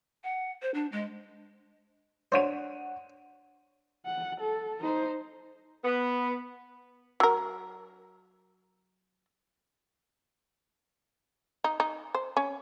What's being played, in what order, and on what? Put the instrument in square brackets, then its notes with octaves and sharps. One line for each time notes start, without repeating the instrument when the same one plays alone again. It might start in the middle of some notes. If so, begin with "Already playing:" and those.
[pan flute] F#5
C5
D4
G#3
[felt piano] D4 F#5 D#7 [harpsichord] C5 C#5
[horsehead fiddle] F#5
A4
D#4 C5
[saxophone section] B3
[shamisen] F#3 A#4
D#4
D#4
C5
C#4